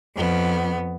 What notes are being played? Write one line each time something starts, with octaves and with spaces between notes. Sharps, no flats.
F2 B3